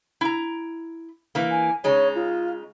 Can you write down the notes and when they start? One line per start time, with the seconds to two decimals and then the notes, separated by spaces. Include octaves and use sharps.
0.21 E4 A#5
1.35 E3 A#3
1.51 G#5
1.84 C#3 G#3 D#4 C#5
2.15 F4